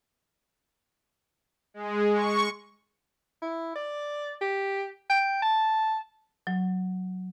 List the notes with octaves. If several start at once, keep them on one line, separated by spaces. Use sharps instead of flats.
G#3
C#6
E4
D5
G4
G5
A5
F#3